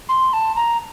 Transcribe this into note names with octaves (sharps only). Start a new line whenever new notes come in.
C6
A5
A#5